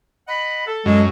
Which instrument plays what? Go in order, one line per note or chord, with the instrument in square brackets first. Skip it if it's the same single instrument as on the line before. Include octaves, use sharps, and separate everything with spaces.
[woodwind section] D#5 F#5 B5
A4
[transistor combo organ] F#2 [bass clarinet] G#3